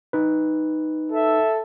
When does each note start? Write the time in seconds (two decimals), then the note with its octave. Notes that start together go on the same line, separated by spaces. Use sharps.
0.13 D#4 B4
1.11 A4 E5